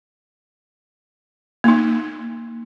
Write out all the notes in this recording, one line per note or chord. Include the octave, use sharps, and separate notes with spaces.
A#3 D#4